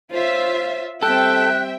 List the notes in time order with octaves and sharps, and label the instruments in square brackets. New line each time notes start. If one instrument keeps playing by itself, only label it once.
[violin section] F4 E5 [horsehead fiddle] C5 C#5
[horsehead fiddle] G3 C4 [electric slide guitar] A4 [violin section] E5 G5 [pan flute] F#6